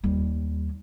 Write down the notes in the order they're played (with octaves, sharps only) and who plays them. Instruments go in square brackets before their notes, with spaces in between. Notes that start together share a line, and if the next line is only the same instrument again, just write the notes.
[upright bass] D#2 G3